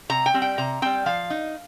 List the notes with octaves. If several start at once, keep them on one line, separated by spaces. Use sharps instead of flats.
C3 A#5
G5
G3 C4
G5
C3 A#5
G3 C4 G5
F3 F5
D#4